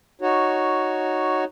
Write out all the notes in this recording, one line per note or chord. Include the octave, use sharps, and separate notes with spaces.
D#4 F#4 C#5